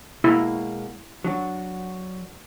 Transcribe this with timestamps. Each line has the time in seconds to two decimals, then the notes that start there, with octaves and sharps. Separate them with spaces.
0.24 B2 G#3 A#3 E4
1.24 F#3 D4 F#4